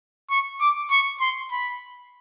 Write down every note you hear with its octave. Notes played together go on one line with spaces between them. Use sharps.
C#6
D6
C#6
C6
B5